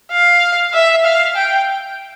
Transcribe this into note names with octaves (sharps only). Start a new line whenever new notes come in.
F5
E5
F5
G5